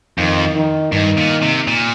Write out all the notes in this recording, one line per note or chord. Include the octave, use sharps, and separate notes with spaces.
F2 D#3
D#3
G2 D#3
A#2
C3
A#2